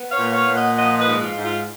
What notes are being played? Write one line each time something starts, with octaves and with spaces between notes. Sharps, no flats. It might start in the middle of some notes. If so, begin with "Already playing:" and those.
Already playing: B3
C#5 F5
A#2
C#5 F5
A#2
D#5 F#5
F3 D#5 F#5
B4 D#5
G#2
F4
G#2
F4